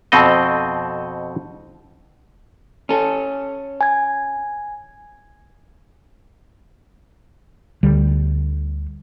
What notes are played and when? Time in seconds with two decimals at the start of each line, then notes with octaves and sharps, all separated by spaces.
0.12 F2 B2 C4 A4 D#5
2.89 C#4 A4
3.81 G#5 G#6
7.83 D2 D3 G3